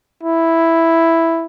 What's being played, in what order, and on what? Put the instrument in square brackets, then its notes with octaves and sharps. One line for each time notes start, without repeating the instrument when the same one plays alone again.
[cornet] E4